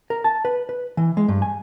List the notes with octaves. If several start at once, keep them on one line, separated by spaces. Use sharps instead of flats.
A#4
A5
B4
B4
E3
G#3
G2
G#5